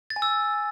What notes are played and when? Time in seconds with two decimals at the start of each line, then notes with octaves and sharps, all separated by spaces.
0.10 A6
0.16 G#5
0.22 E6